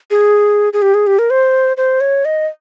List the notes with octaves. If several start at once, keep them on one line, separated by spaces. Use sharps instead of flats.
G#4
G#4
G4
G#4
G4
A#4
C5
C5
C#5
D#5